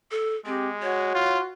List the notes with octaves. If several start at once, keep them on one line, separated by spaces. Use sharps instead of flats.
A4
G#3 C4 G4
F#4 C#5
F4